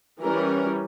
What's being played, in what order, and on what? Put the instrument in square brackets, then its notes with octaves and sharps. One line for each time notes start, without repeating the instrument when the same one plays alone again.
[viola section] E3 G3 C#4 A#4